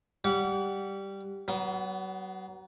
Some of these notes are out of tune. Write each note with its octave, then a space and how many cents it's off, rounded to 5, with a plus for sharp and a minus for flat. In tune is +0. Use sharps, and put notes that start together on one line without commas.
G3 +0 F#5 +0 D6 -45
F#3 +35 B3 +0